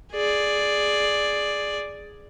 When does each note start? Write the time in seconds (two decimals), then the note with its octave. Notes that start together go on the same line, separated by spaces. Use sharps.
0.13 G#4 D5